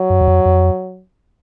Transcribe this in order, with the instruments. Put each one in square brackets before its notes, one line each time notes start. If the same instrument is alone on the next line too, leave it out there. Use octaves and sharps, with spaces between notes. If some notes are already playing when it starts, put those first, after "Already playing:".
Already playing: [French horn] F#3
[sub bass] F#2
E2
F2
F2